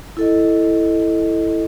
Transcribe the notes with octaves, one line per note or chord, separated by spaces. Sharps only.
E4 A4 D#5